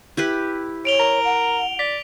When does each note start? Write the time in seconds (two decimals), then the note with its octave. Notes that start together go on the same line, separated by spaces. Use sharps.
0.17 E4 G4 B4
0.85 C#5 D7 F7 G7
1.00 A#4
1.25 F#5
1.79 D5 B6